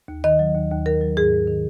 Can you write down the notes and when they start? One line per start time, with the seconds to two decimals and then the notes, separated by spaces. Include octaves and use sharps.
0.08 D#2
0.24 D#3 D#5
0.39 F#3
0.55 D#2
0.71 D#2
0.86 D#3 A#4
1.01 F#3
1.17 G#2 G#4
1.33 G#2
1.48 D#3